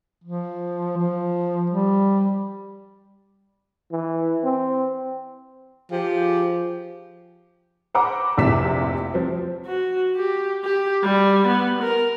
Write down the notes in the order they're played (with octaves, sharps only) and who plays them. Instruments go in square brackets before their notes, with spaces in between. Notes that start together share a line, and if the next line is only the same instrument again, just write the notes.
[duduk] F3
F3
G3
[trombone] E3
C4
[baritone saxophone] F3 [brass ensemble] G4 G#4 F5
[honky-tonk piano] C5 F#5 A#5 B5 D6
F1 A#1 C3 E4 B6 E7
F3 C4
[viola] F#4
G4
G4
G3
B3
A#4